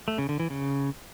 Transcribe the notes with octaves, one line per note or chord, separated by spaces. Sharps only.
A3
C#3
D3
E3
C#3